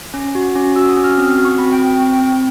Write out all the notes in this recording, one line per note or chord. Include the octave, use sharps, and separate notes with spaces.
C#4
F#4
C#4
F#4 E6
D#6
C#4
F6
C4 D#6
F#4
C#6
C4 B5
G5
C4
G5
C4
C4